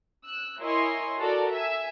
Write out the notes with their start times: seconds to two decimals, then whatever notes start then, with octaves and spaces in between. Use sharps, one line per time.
0.24 E6 F#6
0.60 E4 A#4 C#5 D#5 G#5 C6
1.17 F#4 A4 A#4 D5
1.51 E5 G#5